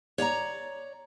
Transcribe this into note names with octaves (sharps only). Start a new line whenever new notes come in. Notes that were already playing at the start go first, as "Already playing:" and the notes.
C#5 D5 F#5 A#5